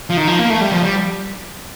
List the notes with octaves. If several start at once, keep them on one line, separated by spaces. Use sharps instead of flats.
F3
D#3
F3
A#3
A3
G3
F3
G3